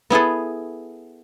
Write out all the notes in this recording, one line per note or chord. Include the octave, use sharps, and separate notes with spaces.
B3 E4 G#4 A4